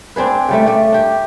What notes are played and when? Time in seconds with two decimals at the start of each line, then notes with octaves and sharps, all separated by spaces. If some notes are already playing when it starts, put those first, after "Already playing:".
0.16 C4 D4 G#4 B4
0.49 C#3 G3 A3
0.67 A3 D5
0.92 D4 G4